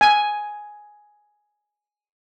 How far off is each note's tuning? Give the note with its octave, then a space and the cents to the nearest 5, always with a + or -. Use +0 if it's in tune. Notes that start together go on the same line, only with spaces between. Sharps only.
G#5 +5